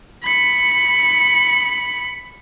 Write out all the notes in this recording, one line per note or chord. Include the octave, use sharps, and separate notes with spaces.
B5 C#7